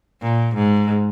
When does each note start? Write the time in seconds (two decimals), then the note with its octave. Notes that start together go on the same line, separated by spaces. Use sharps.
0.22 A#2
0.55 G#2